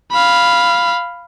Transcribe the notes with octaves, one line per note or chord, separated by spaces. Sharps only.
F5 B5